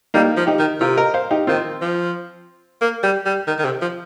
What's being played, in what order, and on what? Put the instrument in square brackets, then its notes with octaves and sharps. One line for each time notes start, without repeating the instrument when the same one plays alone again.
[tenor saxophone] G3 [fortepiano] A#3 D#4
[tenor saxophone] F3
[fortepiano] D#4 G4
[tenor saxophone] D#3
[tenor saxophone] C3 [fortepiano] F4 A#4
[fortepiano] A#4 D#5
C5 F5
D#4 G4
[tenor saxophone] D#3 [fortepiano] C4 F4
[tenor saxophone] F3
A#3
G3
G3
D#3
D#3
C3
F3